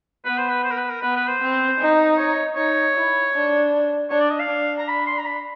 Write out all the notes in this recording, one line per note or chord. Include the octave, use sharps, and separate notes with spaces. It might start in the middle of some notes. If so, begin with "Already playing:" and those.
B3 B4
C5
B4
C5
A#4
B4
A#4
B3 B4
B4
C5
C4
D#4
C#5
D#4 C#5
E4
D4
D4 C#5
D5
D#5
F5
D4
A#5
B5
C6
A#5
B5